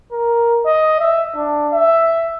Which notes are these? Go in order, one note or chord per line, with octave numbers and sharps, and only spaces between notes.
A#4
D#5
E5
D4
E5